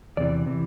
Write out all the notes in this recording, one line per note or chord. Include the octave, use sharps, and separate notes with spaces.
E2 C3 E3 D5
C3 E3